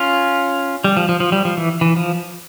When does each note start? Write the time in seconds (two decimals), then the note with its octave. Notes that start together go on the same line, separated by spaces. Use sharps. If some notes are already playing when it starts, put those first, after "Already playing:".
Already playing: C#4 F4
0.84 G3
0.97 F3
1.09 F3
1.20 F3
1.32 G3
1.45 F3
1.57 E3
1.81 E3
1.96 F3